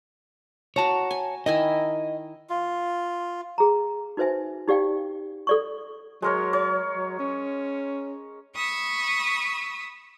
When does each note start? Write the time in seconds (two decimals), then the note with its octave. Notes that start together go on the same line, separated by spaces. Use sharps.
0.76 F#4 C#5 A5 A#5
1.11 G#5
1.46 D#3 E4 D#5 G#5
2.50 F4
3.58 G#4 A#5
4.17 D#4 F#4 B4 C5 E5 G#5
4.68 D#4 G4 D5 F5 G5
5.47 A4 D5 C#6
6.22 F#3 G#3 A#4 C#5
6.53 C#5
6.95 F#3
7.19 C#4
8.55 B5 C#6 D#6 E6